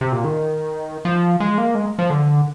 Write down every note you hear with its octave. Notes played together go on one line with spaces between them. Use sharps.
C3
A#2
D#3
F3
G#3
A#3
G#3
F3
D3